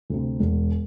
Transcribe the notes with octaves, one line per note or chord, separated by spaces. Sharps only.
D2 C3
E1